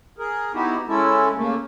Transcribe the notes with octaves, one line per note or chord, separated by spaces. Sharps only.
G#4 A#4
B3 D#4 E4 F#4 G4
G#3 C#4 E4 A4
C#3 A3 A#3